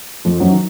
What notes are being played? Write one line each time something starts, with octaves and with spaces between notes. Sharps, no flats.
F2 F3
F#2 F#3
D#3